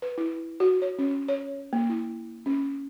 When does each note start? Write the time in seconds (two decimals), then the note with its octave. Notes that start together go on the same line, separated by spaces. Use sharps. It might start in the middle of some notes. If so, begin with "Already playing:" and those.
0.02 B4
0.18 E4
0.60 F#4
0.82 C#5
0.99 C#4
1.29 C#5
1.73 A#3
1.90 E4
2.46 C#4